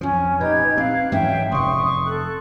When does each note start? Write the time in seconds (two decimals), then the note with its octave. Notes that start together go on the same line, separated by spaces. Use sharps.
0.01 F2 F3 C#4
0.40 A#2 D#4 G4 B4 G#6
0.78 C4 F5 F#6
1.12 G#2 E3 F#3 C#4 E5 G5
1.52 F1 C3 C6 C#6 D#6
2.06 A4 F#6